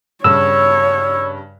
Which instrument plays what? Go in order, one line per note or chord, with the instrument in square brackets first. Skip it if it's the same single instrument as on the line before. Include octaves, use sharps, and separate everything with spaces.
[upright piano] G2 C#3 [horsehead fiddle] C#5 [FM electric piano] E6